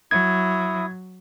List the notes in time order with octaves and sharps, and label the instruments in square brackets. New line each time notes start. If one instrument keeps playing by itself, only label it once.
[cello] F#3 [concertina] E4 D#6 [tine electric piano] G#6